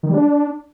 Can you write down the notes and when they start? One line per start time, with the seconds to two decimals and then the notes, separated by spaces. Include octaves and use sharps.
0.03 D#3
0.09 G3
0.14 D4